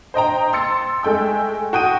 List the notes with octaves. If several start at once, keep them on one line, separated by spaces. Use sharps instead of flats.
C5 D#5 G5 A#5
C6 E6 A6 C#7
G#3 A3 G5 E6
F#4 G5 D#6 D#7